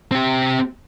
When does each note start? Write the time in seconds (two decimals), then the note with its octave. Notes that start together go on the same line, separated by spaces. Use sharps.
0.12 C4 G4